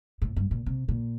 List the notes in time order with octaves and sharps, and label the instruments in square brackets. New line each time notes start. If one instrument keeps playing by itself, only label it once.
[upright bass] A2
G2
A#2
C3
A#2